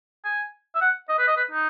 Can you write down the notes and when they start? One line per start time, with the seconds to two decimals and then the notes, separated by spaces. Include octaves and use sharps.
0.25 G#5
0.75 E5
0.81 F#5
1.09 D#5
1.19 B4
1.28 D#5
1.37 B4
1.51 D#4